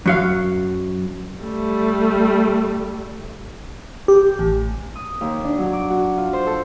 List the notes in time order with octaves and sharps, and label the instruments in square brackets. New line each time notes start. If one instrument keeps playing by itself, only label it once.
[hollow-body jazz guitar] F#2 F#3 F5
[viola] G3 A3
[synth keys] G4
A1
[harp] D#6
D#2
D4
F#3
D6
F#4
F4
C5
A4